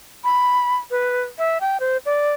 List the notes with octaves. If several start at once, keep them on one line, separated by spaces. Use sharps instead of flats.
B5
B4
E5
G5
C5
D5